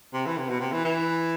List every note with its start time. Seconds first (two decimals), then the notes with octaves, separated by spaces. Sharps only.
0.14 C3
0.26 E3
0.38 C3
0.49 B2
0.60 C3
0.72 E3
0.85 E3